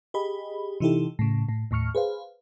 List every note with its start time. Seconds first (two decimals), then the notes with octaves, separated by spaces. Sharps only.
0.14 G4 G#4 D#5 B5
0.80 C3 E3 D#4 E4 G4 A4
1.19 A2 C#3
1.49 A2
1.71 D#2 A2 C#6 F6 C#7
1.95 G#4 B4 C5 F5